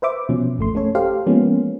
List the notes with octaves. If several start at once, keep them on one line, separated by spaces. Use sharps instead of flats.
B4 C5 E5 D6
B2 F3 C#4
G#1 F2 A3 C6
A3 C#4 A4 C#5
G4 A4 C5 F5
F3 G#3 A#3 B3 C#4